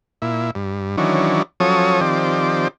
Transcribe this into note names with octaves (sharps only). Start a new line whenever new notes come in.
A#2 E4
G2
D#3 E3 F#3 C#4 D4
F3 F#3 C#4 A4 C#5 D#6
D#3 F3 C4 G4 D5